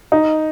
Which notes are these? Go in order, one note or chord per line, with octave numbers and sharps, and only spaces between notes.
D#4